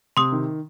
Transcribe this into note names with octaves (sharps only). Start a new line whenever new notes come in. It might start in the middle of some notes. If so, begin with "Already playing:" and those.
C3 C6 D#6
D#3